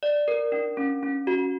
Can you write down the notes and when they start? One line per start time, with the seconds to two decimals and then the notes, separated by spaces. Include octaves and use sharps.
0.03 D5
0.28 A#4
0.52 D4
0.77 C#4
1.03 C#4
1.27 F#4